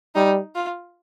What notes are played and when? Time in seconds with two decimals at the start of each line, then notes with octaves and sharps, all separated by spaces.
0.15 G3 D#4
0.55 F4